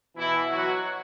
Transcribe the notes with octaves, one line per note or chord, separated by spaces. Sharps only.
B2 E3 E4
F#3 F#4